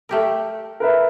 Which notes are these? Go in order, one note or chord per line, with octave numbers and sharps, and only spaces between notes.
A3 G4 A#4
A#4 B4 E5